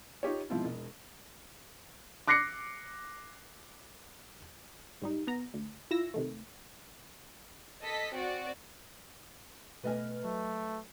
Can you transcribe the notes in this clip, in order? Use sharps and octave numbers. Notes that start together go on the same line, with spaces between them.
D#4 F4 G4 C#5
G#2 B2 F3 C4 E4 F4
E1
D6 F#6 A#6 C7 C#7
G#2 G3 D#4
B3 A#5
D2
E4 F4 E6 A#6
C3 D#3 A3
A4 D#5 B6
C4 F#4 D5
B2 A3 B4 D#5 G#5 F6
F#3 A3